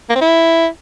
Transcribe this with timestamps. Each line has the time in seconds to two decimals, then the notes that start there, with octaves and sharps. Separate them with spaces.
0.10 A#3
0.15 C4
0.21 E4